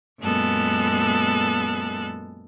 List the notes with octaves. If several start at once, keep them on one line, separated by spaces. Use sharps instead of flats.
F#2 A#2 G#3 B3 A4 F#6